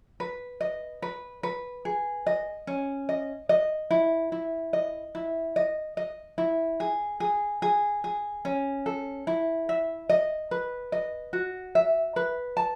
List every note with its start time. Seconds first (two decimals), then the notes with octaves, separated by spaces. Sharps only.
0.20 B4
0.61 D#5
1.02 B4
1.43 B4
1.85 G#4
2.27 D#5
2.67 C#4
3.09 D#5
3.49 D#5
3.91 E4
4.32 E4
4.73 D#5
5.15 E4
5.56 D#5
5.97 D#5
6.38 E4
6.80 G#4
7.20 G#4
7.62 G#4
8.04 G#4
8.45 C#4
8.86 A4
9.27 E4
9.69 E5
10.10 D#5
10.51 B4
10.92 D#5
11.33 F#4
11.75 E5
12.16 B4
12.57 A5